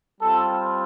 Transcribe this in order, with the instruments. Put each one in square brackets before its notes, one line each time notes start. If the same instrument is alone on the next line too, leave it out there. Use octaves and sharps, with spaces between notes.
[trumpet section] G3 C4 F4 A4